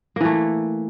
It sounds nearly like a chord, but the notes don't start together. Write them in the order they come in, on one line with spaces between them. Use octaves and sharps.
A#3 E3 A3